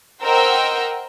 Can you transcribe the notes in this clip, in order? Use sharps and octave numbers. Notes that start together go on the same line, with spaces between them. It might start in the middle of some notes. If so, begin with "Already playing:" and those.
A#4 C5 D#5 F#5 G5 E6